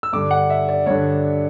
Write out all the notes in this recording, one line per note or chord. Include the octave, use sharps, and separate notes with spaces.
E6
G2 D3 D6
F#5
E5
D5
G2 D3 C#5